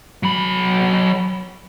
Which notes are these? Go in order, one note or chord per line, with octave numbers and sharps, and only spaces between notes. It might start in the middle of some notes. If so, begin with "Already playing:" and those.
F#3 B5